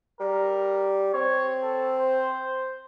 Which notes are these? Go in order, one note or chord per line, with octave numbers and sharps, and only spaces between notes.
G3 A#4
C4 C#5
A4
C5